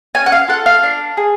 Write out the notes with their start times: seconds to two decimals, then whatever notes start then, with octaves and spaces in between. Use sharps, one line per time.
0.15 C#4 G#5
0.26 F#5
0.32 F5
0.48 F4 A4 F#5
0.66 F5
0.83 D4
1.17 G#4